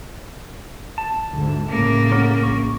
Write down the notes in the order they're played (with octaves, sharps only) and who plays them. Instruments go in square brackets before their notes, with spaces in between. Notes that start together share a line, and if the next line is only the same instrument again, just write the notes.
[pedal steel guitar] A5
[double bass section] D2 G#2 D3
[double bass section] A2 [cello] C#3 A#3
[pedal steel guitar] C#4 A#4 F#5
[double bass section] A#1 [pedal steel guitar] C#6